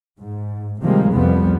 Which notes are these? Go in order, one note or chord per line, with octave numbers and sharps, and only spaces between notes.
G#2
C3 D#3 F3 G3 G#3 A#3
C2 F2 F3 G3 B3